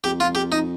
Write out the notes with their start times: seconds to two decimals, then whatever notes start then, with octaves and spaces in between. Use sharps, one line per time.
0.04 F2 G4
0.20 F4
0.35 G4
0.52 D#4